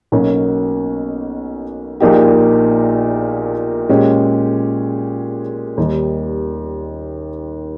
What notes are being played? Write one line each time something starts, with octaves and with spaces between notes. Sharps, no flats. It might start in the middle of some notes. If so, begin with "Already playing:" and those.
B1 B2 A#3 C#4
A#1 A#2 A#3 D#4 G4
A#2 G#3 C#4 G4
D#2 D#3 G3